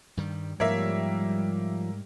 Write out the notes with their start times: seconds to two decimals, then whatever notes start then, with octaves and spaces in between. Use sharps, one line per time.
0.17 G2 D#3 G3
0.60 G#2 F3 G3 A#3 C#5 E5